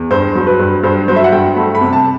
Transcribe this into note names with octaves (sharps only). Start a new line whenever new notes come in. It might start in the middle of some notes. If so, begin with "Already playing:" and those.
Already playing: E2
G2 C5
F#3
B4
G2
G2 C5
F#3 C5
E5
F#5
G2 G5
A3 B5
B5
C3
A5